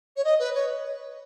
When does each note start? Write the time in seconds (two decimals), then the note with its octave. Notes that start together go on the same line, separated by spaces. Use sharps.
0.16 C#5
0.24 D#5
0.39 B4
0.54 C#5